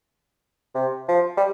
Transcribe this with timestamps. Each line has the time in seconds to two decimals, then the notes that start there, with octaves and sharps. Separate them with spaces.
0.75 C3
1.09 F3
1.37 G3